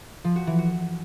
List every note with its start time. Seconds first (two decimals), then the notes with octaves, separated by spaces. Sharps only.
0.24 F3
0.36 F#4
0.47 E3
0.58 F#4